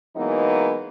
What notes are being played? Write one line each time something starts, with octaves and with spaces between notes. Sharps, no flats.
E3 F#3 G#3 A#3 B3 D#4